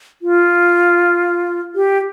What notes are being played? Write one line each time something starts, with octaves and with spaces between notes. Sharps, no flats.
F4
G4